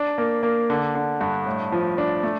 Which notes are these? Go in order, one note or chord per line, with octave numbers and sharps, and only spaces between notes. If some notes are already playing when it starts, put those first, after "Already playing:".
Already playing: D4
A#3
A#3
D3
D3
G2
A2
F3
D4
A3